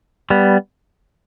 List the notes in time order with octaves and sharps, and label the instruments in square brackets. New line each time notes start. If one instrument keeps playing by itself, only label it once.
[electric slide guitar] G3 B3